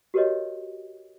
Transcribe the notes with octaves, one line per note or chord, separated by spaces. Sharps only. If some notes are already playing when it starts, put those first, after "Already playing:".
F#4 G4 A#4 B4 C#5 D#5